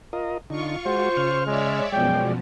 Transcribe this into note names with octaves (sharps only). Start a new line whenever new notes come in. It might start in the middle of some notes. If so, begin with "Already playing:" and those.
F4 A#4 D#5
D3 D#4 F4 C#6
G#3 F#4 C5
C#3 F6
G#3 C#5 D5 E5
F#2 B2 F3 G#3 D5 G5